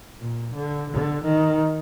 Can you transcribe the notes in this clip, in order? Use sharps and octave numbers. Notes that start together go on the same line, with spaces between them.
A#2
D3
D3
D#3